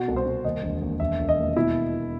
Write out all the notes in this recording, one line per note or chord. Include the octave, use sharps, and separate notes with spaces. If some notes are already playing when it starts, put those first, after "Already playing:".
Already playing: B2 F#4
C2
C5
C2
D#2 D#5
E1
D#2
E1 E5
E1
D#5
D#2
B2 E4